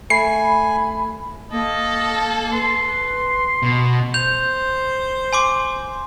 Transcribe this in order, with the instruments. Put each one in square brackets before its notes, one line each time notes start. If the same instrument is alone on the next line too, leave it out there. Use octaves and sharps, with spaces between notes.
[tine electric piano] A3 [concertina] G#5 [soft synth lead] B5 [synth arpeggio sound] C7
[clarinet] A#3 [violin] A4 [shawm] D#5
[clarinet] B4 [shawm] C6
[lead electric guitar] B2
[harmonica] C5 [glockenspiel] G6 F7
[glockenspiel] G#5 C6 D6